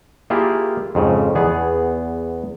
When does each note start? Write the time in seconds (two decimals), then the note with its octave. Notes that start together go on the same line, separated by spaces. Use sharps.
0.30 A#3 E4 F4 G4 G#4
0.95 F2 G#2 C#3
1.35 E2 B3 G#4